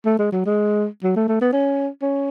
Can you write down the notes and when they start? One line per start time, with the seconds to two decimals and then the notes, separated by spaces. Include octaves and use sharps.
0.05 A3
0.19 G#3
0.32 F#3
0.45 G#3
1.03 F#3
1.16 A3
1.28 A3
1.41 B3
1.53 C#4
2.02 C#4